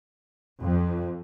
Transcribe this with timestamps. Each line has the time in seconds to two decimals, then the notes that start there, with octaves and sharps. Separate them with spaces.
0.62 F2